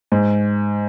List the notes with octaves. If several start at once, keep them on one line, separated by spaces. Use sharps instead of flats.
G#2